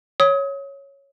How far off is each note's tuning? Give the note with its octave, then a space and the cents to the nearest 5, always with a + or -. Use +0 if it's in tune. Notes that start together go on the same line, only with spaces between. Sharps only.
C#5 +0 D#6 +35